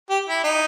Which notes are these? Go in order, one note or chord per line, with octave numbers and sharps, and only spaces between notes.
G4
E4
D#4